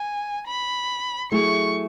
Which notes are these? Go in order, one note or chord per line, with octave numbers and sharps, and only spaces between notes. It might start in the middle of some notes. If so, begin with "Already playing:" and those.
Already playing: G#5
B5
F#3 A3 E4 G#4 C#6